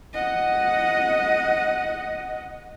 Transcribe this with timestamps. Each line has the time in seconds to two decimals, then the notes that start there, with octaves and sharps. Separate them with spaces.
0.13 D#5 F#5